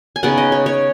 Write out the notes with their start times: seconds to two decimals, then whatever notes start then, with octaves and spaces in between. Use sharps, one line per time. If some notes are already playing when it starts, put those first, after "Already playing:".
0.16 G#5
0.23 C#3 B3 D#4 F#5
0.38 D#5
0.52 C#5
0.66 C#5